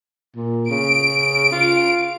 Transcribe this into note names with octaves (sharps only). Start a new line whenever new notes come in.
A#2
C#3 D7
F4